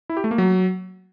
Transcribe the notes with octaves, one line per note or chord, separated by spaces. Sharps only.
E4
G4
A3
A#3
F#3